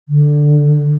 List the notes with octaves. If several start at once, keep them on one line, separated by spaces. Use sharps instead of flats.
D3